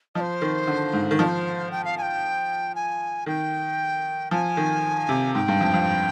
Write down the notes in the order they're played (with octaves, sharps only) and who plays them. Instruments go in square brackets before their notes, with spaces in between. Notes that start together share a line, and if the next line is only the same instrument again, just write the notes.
[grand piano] F3 [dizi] D#5
[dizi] C5
[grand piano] D#3
D3
G#2
D#3
[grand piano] F3 [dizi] D#5
[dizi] C5
G5
F5
G#5
G5
G#5
[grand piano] D#3 [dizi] G5
[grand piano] F3 [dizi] G#5
[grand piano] D#3
C3
[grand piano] G#2 [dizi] G5
[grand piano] G2
F2
F2